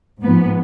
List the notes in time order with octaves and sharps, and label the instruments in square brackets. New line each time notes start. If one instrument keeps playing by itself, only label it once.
[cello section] G#2 F3 B3